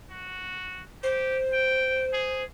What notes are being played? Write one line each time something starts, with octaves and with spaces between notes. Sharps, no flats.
F#4
G4 C5
G5
G#4